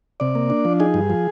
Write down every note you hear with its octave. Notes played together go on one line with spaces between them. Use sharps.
C3 D5
A#3
D4
F3
D#4 G#4
G2
F3